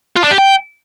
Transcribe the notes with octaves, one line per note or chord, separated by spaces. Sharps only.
F4
D4
G4
G5